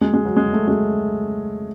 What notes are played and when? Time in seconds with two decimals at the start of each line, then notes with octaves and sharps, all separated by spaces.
0.01 G#3
0.14 G#3
0.25 F#3
0.37 G#3
0.53 A3
0.68 G#3